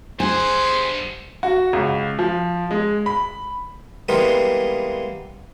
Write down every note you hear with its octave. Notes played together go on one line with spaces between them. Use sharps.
G2 G#4 C5 F#5 G#5
F#4
C#2
F3
G#3
B5
E3 G3 G#3 A#3 B3 F4